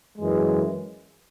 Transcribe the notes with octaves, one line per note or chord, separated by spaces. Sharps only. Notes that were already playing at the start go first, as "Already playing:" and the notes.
F#2 E3 G#3